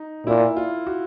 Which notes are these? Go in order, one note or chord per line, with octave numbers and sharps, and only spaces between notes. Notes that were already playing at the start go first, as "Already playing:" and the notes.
Already playing: D#4
A#2 E4
F4
F#4